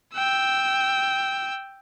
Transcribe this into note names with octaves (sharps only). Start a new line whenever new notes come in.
G5 E6